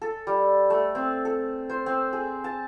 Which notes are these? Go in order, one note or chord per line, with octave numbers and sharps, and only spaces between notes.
A4
G3
A3
C4
A4
C5
C4
G#4
A5